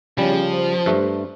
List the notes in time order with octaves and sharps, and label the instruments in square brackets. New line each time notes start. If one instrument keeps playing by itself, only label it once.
[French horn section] E2 C#4 [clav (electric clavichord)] C#3 G3 [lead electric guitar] F3
[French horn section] C5
[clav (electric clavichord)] G2 A3